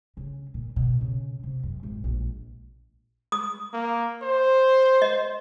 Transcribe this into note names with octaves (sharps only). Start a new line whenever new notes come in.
C#3
A#2
B2
C#3
C3
F#2
G#1
A#1
D#6
A#3
C5
D#5